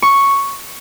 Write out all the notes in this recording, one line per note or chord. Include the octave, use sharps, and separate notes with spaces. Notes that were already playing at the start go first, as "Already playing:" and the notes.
C#6